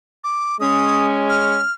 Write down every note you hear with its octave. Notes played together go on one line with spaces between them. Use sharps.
D6
G#3 C#4 D#6
F6